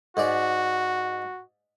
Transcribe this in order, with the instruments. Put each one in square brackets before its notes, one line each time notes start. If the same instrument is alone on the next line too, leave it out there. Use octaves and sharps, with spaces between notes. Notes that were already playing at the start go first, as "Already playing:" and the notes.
[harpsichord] G#2 G#3 D5 [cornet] F#4